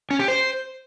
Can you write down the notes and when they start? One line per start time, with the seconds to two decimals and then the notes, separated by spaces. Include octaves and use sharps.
0.11 C#4
0.19 G4
0.28 C5